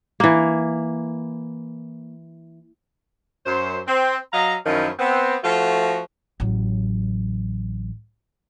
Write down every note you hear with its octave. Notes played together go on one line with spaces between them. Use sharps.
E3 A#3
F#2 C5
C4
F#3 D#5 F5 A#5
F#2 D#3 F3 C#4 E4
B3 C4
F3 A3 F4 F#4
A1 F#3